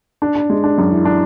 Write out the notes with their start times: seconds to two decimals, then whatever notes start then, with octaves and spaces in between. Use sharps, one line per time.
0.22 D4
0.35 D4
0.50 G#3
0.64 D4
0.78 F#2
0.91 E3
1.05 D4